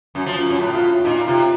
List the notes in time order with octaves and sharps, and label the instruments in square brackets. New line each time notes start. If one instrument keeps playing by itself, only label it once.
[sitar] F#2 [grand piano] F#4
[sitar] F3
[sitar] F#2 [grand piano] F4
[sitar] F#2
A2
[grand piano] F4
F4
[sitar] A#2 [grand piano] D#4
[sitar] C3 [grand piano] F4